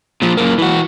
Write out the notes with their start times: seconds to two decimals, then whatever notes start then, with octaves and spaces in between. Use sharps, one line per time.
0.22 A#2 F3
0.37 F#2 A#3
0.58 E3 F#4